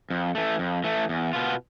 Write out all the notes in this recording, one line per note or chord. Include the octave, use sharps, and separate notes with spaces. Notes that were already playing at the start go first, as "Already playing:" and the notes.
F2
E3 A3
F2
E3 A3
E2
B2 B3 F4